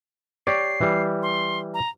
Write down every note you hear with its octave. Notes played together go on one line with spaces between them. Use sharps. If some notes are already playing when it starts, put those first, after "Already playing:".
G4 C#5 D5 C7
E3 G3
C6
A#5